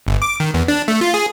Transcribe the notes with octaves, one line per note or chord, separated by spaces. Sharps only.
G1
D6
D#3
E2
D4
A3
F4
G#4